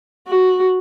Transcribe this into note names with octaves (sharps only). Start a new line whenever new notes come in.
F#4